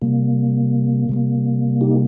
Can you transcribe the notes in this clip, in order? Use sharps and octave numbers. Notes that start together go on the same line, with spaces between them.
C3 G3 A#3
C3 G3 A#3
D#4 G4